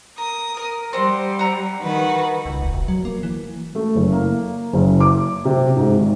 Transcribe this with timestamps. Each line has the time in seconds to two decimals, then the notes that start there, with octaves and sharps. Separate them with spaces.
0.18 A#4 D#6
0.57 A#4
0.93 G3 C4 F#5 C6
1.39 F#5 A#5 E6
1.81 D#3 F#4 B4
2.46 C#2
2.61 D#1
2.73 E1
2.88 F#3
3.05 A#3
3.23 E3
3.75 A3
3.95 F#1
4.12 A#3
4.73 F#1
5.00 D6
5.45 C3
5.76 G#2
5.99 G#1